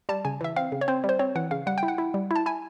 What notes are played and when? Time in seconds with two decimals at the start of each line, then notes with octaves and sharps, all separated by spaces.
0.09 G3 A5
0.25 C#3 G#5
0.41 E3 E5
0.56 C4 F5
0.72 C#3
0.81 C#5
0.88 C4 C5
1.04 G3
1.09 C5
1.19 C4 C#5
1.35 E3 F#5
1.51 C#3 F5
1.67 G3 F#5
1.78 G5
1.83 E4
1.88 F#5
1.98 E4
2.14 G3
2.31 E4 A5
2.46 E4 G#5